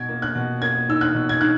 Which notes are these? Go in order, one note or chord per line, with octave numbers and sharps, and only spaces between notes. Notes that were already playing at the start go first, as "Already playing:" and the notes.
Already playing: B2 G#6
A#3
F#6
B2
A#3 G#6
D#4 E6
F#6
B2
G#6
D#4 F#6